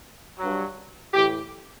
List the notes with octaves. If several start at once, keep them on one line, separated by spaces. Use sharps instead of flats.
G2 F#3
A2 E3 G4